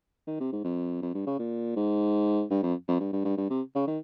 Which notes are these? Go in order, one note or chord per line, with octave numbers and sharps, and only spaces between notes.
D#3
C3
G#2
F2
F2
G2
C#3
A#2
G#2
G2
F2
F2
G2
G2
G2
G2
C3
C#3
D#3